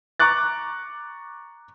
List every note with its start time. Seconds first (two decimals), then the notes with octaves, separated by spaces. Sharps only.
0.20 A#5 C#6 D6 F#6 A6